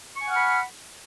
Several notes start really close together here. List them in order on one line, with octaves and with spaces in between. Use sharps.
C#6 G#5 F#5 F6 B5